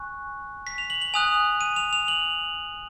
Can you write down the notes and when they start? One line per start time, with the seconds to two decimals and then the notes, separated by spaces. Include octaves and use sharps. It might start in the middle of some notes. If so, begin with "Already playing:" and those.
Already playing: G#5 C#6 F#6
0.67 B6
0.78 F7
0.90 F#7
1.02 F#7
1.14 G#5 D#6 F#6 F7
1.61 D#7
1.76 F7
1.93 F7
2.08 F#7